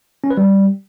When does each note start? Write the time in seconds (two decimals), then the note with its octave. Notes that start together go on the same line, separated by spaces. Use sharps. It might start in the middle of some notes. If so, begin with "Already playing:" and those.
0.24 C#4
0.30 B4
0.37 G3